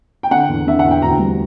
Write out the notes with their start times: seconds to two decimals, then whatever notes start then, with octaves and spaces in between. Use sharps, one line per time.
0.23 G5
0.31 D3 F#5
0.49 E2
0.67 D3 E5
0.79 E2 F#5
0.91 G5
1.02 D2 A#5
1.19 G3